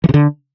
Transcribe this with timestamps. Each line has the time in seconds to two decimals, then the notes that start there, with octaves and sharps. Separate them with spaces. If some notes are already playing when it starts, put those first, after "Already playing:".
0.04 E3
0.09 C3
0.14 D3